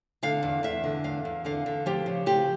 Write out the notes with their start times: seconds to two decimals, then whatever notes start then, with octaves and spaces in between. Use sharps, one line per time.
0.23 D3 F5
0.43 E2
0.63 E2 E5
0.84 D3
1.04 E2 F5
1.25 E2
1.45 D3 F5
1.66 D3
1.86 F3 G4
2.06 C#3
2.26 F3 G4